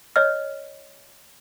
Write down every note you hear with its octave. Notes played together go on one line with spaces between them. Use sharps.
C#5 D#5 F6